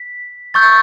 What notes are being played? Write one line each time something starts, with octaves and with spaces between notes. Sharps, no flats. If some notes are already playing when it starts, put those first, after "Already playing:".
Already playing: B6
C#6 E6 G6 A6